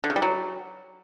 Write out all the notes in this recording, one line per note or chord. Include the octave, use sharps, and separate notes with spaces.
D3
C#3
G3
F#3